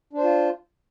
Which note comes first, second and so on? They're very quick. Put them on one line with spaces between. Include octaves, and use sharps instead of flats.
D4 C5 F4